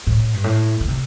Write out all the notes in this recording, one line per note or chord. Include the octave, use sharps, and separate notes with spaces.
A2
G2
A2
D3
C3